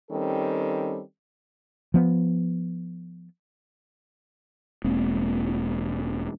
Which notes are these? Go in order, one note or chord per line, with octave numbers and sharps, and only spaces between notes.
D#3 G3 C4 C#4 A4
F3 B3
E1 G#3 A#3 C4